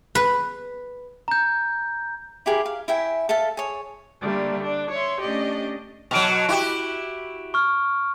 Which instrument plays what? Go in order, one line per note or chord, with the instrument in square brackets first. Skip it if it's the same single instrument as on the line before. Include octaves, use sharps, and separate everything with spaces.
[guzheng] B4
[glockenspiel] A#5 G6
[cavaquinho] E4 G4 G#4 A#4
F5
E4 E5 G5 G#5
A4 E5 F5 A5
G#4 C#5
[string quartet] D3 G3 A3 A#3
D4
C#5 E5 C6
A3 C#4 D4 G4 D5 D#5
[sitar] B2 F#3 [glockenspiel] D7 F7
[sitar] E4 F#4 G4
[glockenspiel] C#6 F6